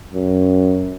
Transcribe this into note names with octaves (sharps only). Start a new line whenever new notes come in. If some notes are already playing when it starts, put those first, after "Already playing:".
F#2